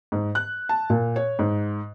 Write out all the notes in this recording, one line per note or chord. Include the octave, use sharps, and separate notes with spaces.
G#2
F#6
A5
A#2
C#5
G#2